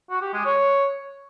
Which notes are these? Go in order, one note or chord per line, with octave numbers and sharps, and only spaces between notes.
F#4
G4
G#3
C#5